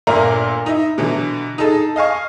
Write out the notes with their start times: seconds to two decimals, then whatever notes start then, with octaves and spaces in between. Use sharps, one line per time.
0.07 G1 A#2 A#4 D5 E5 A#5
0.66 D#4 E4
0.98 B2 D3 E3 F#3
1.58 D#4 G#4 A4 A5
1.96 D#5 F5 G#5 C#6